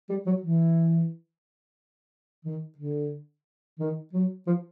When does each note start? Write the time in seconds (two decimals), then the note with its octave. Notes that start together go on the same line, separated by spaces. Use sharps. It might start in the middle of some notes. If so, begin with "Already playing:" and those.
0.09 G3
0.26 F#3
0.42 E3
2.45 D#3
2.78 D3
3.79 D#3
4.13 F#3
4.47 F3